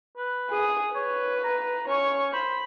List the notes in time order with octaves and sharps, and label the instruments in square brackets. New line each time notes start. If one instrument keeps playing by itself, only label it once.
[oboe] B4
[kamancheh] G#4 D#6
[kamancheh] B4 [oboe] C#5
[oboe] A#5
[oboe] C#4 [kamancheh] C#5 C#6
[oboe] C5 [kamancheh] B5